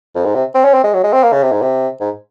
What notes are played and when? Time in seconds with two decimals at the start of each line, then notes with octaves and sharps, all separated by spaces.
0.15 F2
0.25 G#2
0.35 C3
0.55 C4
0.65 C#4
0.74 C4
0.84 G#3
0.94 F#3
1.04 G#3
1.13 C4
1.23 A#3
1.33 C#3
1.43 C3
1.52 G#2
1.62 C3
2.00 G#2